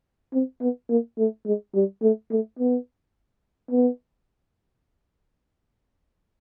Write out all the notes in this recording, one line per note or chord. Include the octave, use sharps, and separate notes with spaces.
C4
B3
A#3
A3
G#3
G3
A3
A3
B3
B3